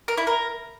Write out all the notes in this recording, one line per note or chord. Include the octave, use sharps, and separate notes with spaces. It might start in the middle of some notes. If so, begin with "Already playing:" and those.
A#4
E4
A#4